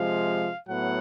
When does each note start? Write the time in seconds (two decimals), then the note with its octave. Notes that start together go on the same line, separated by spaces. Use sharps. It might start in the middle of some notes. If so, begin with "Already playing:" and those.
Already playing: C3 F3 G#3 F5
0.67 A2 F#3 B3 F#5